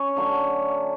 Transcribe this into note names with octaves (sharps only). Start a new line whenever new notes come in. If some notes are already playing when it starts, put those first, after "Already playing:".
Already playing: C#4
D3 F#3 A3